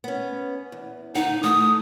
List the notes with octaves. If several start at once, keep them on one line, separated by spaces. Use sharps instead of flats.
B3 C#4
E2
D3 D#4 F#5
E3 A3 D#6